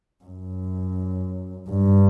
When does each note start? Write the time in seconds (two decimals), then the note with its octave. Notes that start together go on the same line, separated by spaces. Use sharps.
0.24 F#2
1.69 G2